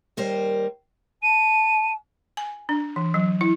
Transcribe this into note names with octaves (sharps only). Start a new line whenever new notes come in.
D#2 G3 A#4 C5
A5 D#7
G#5
D4
E3
F#3
E4